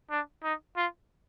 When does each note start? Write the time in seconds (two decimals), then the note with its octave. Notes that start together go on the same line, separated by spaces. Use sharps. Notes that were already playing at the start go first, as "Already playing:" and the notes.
0.10 D4
0.44 D#4
0.76 F4